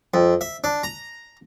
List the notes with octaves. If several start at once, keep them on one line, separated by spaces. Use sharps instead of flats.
F2
E5
D4
A#5